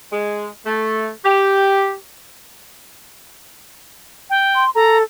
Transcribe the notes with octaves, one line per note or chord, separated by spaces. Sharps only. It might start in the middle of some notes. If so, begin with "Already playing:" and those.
G#3
A3
G4
G5
C6
A4 A#5